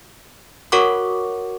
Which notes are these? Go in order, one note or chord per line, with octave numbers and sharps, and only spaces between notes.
F#4 A#4 C#5 F#5 C#6 D6